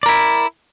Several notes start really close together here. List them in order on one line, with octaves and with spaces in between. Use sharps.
D5 A#4 E4